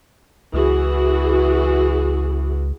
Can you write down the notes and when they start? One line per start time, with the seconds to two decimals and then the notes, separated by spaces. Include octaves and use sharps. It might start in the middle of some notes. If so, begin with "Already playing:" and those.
0.53 C#2 E3 F#4 G#4